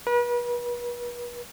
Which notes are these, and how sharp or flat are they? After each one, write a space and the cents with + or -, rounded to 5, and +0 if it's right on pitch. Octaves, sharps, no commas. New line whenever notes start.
B4 -40